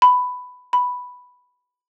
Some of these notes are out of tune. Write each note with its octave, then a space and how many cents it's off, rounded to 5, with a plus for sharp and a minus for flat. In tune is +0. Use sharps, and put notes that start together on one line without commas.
B5 +10
B5 +0